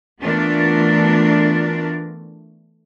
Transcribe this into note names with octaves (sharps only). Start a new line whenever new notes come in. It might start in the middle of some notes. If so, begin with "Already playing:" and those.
E3 A3 B3 D4 F4 A#4